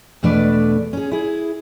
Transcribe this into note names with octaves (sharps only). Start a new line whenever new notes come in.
E2 B2 A3 D4 B4 D5
C#4 G#4
E4 G#4